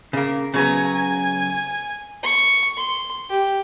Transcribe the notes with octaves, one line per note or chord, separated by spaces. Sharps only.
C#3 A#3
C#3 F#3 B3 G#5 A#5
G#5
C#6
C6
G4